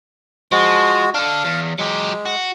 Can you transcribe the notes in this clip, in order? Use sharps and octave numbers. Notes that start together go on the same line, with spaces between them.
F3 G#3 F#4
D4 A4 F5
E2
F#3 G#3 G4
F#4